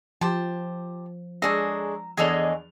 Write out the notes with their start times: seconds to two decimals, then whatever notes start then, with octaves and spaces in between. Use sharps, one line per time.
0.21 F3 G4 C5 A5
1.42 G#3 D4 G#4 A4 C#5 A#5 E6
2.17 E2 D4 G#4 A4 C#5 D#5 G#5 F7